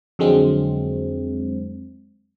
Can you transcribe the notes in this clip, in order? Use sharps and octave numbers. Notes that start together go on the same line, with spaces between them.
F2 D3 F#3 G#3 C4